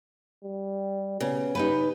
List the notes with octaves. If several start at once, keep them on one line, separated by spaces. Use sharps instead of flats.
G3
C#3 B3
D#4 G4 B4